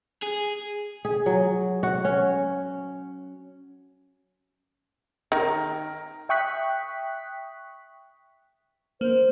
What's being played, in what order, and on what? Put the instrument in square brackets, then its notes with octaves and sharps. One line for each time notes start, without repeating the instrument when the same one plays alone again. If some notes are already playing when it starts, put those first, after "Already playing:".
[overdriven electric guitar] G#4
[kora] G#4
F#3
F#4
C#4
[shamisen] D#3 [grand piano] A#4
[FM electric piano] E5 G5 C#6 D#6 F#6 B6
[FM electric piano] A#3 [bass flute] C5